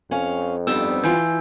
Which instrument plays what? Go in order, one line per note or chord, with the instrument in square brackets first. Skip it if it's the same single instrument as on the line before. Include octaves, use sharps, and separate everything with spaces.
[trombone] F2 [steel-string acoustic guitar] C#4 F5
[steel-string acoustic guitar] G2 B3 C4 [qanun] G3 D#4 A5 [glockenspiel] E6
[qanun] E3 F4 [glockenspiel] G#5 G6